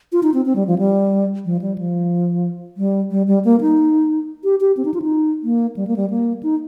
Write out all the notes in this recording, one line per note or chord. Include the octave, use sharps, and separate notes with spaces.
F4
D#4
C4
C4
G3
F3
G3
F3
G3
F3
G3
G3
G3
A#3
D#4
G4
G4
C4
D#4
F4
D#4
A#3
G3
A#3
G3
A#3
D#4